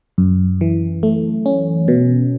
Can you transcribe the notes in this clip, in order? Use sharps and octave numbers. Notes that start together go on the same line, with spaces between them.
F#2
E3
A3
C#4
B2